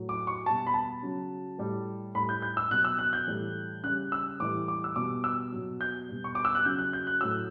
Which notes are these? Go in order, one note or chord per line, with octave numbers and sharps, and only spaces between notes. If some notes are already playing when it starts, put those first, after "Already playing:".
Already playing: A2 F#3
D6
C#6
B2 G3 A5
B5
A5
C#3 F#3
A2 G3
A2 G3 B5
G6
G6
E6
B2 F#3 F#6
E6
F#6
G6
A2 E3 G3
C#3 G3 F#6
E6
A2 E3 G3 D6
D6
E6
B2 G3 D6
E6
B2 F#3
G6
B2 G3
C#6
D6
E6
F#6
C#3 F#3 G6
F#6
G6
F#6
A2 F#3 E6